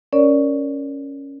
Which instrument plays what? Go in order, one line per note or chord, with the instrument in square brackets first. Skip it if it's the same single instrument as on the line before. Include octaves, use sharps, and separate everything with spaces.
[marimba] C#4 A#4 C#5 D5